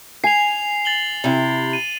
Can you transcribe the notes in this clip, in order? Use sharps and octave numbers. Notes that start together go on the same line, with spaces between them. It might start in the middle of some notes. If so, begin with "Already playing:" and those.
G#5 C7 F7
A6 F#7 G7
C3 E4
D#7